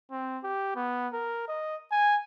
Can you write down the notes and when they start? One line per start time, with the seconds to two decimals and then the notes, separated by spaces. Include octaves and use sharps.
0.11 C4
0.44 G4
0.76 B3
1.13 A#4
1.48 D#5
1.91 G#5